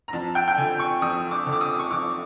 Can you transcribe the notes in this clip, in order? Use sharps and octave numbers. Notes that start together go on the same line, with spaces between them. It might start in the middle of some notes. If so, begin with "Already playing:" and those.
A#5
F2 A5
G5
G5
D3 G#5
C#6
F2 D#6
D6
D3
D6
D#6
C#6
F2 D6